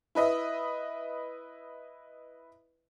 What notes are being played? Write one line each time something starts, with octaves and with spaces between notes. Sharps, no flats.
E4 B4 D#5 E5